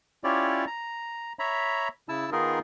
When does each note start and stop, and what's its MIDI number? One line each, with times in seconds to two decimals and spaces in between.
0.24 0.65 61
0.24 0.65 64
0.24 0.65 65
0.24 0.65 67
0.24 0.65 73
0.24 0.65 74
0.67 1.33 82
1.39 1.88 73
1.39 1.88 76
1.39 1.88 82
1.39 1.88 83
2.09 2.30 49
2.09 2.30 64
2.09 2.30 81
2.09 2.30 88
2.32 2.59 51
2.32 2.59 59
2.32 2.59 63
2.32 2.59 65
2.32 2.59 68
2.32 2.59 70